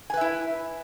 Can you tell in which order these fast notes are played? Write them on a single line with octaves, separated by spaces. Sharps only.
G#5 B4 E5 E4